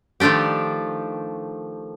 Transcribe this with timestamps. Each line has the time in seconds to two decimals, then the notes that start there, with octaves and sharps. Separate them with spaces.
0.20 D#3 F3 A3 D4 G4